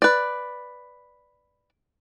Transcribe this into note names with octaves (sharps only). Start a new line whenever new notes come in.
B4 D5